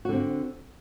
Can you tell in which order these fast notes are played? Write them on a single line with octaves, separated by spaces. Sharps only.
F#4 D3 C4